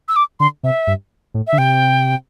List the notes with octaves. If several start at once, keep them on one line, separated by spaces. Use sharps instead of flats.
E6
D6
D3 C6
C3 E5
G2
A2
E5
D3
C3 G5